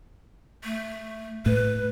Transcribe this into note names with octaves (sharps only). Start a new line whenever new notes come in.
A3
A2 B4